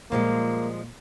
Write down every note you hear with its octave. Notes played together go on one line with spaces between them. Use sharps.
A#2 F3 G3 G#3 A#3